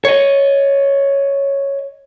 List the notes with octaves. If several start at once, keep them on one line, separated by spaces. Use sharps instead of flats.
C#5 D#5